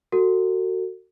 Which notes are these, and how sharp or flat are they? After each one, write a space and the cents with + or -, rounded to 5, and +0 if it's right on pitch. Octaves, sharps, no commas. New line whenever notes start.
F#4 +10 A4 +40